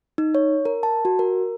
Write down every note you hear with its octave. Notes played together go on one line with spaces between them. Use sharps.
D#4
C#5
A#4
A5
F#4
A#4